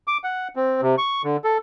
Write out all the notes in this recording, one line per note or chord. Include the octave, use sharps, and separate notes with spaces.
D6
F#5
C4
C3
C#6
D3
A4